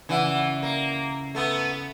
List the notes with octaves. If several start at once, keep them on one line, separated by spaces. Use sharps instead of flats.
C#3 E3 D5 F#5
A#3
A3 B3